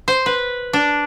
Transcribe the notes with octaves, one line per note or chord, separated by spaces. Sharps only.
C5
B4
D4